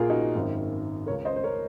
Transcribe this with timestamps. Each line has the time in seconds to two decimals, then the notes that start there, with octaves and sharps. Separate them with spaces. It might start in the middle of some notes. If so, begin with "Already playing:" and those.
Already playing: A#1 A#2 F4 G#4 A#4
0.10 D#4 F#4
0.35 G#1 F#2 D#3
1.06 C#2 C#3 A#4 C#5
1.25 C5 D#5
1.36 C5
1.43 A#4 C#5